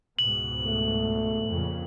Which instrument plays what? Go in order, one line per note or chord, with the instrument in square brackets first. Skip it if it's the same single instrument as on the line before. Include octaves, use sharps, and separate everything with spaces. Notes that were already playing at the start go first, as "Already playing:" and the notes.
[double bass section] C#2 G#2 B2 [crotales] F#7
[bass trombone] A3
[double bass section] F2 A#2 C#3